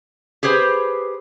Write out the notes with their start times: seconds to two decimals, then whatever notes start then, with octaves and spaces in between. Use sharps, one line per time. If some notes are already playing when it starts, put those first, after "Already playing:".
0.43 G4 G#4 B4 C5